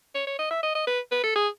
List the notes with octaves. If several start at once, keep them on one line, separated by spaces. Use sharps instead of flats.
C#5
C#5
D#5
E5
D#5
D#5
B4
B4
A4
G#4